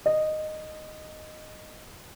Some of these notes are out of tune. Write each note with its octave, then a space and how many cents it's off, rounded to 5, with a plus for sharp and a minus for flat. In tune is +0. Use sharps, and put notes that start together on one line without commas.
D#5 -10